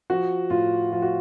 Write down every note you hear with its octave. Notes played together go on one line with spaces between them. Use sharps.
F3 F#4
A2 F4
F3 F4
F#4